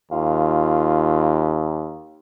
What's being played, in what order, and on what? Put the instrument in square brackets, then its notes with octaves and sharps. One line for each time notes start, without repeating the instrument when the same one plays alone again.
[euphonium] D#2 [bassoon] F4